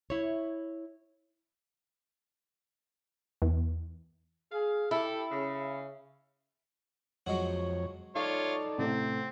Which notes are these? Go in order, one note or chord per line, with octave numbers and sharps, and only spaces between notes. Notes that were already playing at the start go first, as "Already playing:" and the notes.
E4 C#5
E2
G#4 F5
E4 G4 A4
C#3
F2 F#3 G#3 F#4 C#5
D#4 F4 A4 C#5 D5 F5
A1 C3 A3 C4